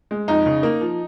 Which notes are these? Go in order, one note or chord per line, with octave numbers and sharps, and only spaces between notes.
G#3
F2 D#4
C#3
A#3
F3